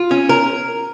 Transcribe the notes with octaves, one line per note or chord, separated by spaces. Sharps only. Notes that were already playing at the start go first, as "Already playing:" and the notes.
Already playing: F4
C#4
A#4